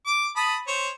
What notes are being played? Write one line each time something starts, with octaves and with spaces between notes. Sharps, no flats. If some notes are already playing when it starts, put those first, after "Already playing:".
D6
A5 B5 D#6
C5 C#5